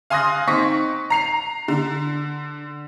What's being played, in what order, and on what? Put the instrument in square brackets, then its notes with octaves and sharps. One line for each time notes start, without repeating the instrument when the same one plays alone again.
[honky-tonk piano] F5 G#5 C6 D#6 F#6 A#6
C4 D#4 C#6 A#6 B6
A#5 C7 F7
D3